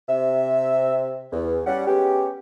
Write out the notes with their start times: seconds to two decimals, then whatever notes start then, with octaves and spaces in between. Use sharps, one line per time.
0.09 C3 E5
1.32 E2
1.66 G3 C#4 F#5
1.87 G#3 B3 C#4 G4